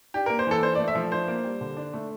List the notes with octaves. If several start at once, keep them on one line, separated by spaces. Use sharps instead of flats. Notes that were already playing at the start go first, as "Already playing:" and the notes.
D4 G4
A#3 A#4
C5
E3 A4
D4 C5
D5
A3
E5
F3
D4 C5
A#3
G3
D3
D4
A3